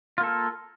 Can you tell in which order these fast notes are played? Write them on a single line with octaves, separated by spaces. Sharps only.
F4 A#3 A4